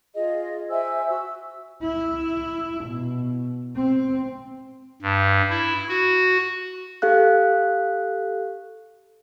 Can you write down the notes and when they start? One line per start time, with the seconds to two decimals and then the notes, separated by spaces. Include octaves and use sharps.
0.15 F4 G#4 D#5
0.70 C5 E5 G#5 E6
1.08 F#4 E6
1.82 E4
2.85 B2
3.76 C4
5.02 G2
5.50 E4
5.89 F#4
7.02 G4 A4 F5 F#6